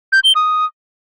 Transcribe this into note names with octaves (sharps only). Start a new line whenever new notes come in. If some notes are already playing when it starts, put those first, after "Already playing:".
G6
G7
D#6